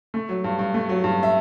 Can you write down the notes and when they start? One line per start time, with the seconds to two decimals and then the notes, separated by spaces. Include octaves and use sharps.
0.14 A3
0.29 F#3
0.44 G2
0.59 G2
0.74 A3
0.89 F#3
1.04 G2
1.23 E5